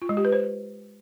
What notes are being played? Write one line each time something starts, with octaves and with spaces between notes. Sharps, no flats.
F4
G#3
G4
B4
C5